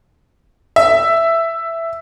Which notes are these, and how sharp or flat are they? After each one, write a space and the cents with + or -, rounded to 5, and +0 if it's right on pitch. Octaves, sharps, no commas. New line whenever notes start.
E5 +10